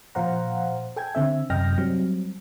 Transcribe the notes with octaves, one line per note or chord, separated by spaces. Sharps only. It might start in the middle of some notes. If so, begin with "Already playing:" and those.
A#2 F3 C5 F5 F#5 A#5
A4 G5 G#5 G#6
D3 C4 E5
F#2 C3 D#5 G5 F6 A#6
F#3 G3 C4